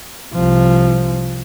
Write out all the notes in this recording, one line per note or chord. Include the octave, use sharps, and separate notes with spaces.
C2 F3